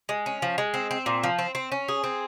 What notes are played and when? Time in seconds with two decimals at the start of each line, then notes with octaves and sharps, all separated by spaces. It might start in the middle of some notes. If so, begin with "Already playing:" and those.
0.09 G#3
0.26 C#4
0.42 F3
0.58 G#3
0.74 C4
0.91 C4
1.06 A#2
1.23 F3
1.39 C4
1.55 C4
1.72 C#4
1.88 G#4
2.04 C4